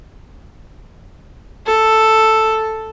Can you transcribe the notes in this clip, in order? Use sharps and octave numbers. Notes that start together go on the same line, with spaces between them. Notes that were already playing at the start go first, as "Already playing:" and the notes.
A4